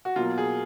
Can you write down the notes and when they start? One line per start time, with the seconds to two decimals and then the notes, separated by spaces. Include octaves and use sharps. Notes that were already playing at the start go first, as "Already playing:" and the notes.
0.05 F#4
0.16 B2 F#3 A#3 F4
0.38 G#4